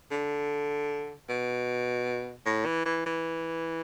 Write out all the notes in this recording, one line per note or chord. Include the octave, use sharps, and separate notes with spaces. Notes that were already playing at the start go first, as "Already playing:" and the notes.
D3
B2
A2
E3
E3
E3